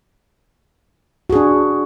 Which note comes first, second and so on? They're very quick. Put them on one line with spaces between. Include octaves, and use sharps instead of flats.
F#4 G#4 D4